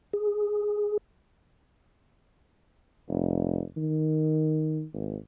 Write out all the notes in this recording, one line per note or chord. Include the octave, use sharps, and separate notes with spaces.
G#4
F1
D#3
G#1